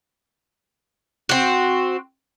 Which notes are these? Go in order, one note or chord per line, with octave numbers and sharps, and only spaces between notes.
C4 F#4